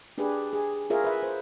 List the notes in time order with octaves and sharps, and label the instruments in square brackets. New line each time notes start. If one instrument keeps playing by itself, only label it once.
[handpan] D4 G4 G#4 B4
G#4
F4 G#4 A#4 C#5 E5
B4 E5
C5